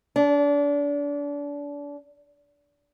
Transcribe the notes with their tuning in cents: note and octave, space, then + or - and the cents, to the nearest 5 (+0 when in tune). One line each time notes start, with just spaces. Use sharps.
D4 -30